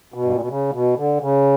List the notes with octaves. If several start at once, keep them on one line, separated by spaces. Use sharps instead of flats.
B2
G2
A#2
B2
C#3
B2
D3
C#3